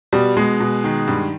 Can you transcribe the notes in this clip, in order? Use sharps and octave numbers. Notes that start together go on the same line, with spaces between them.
B2 G3
B2 G#3
B2
D#3
G2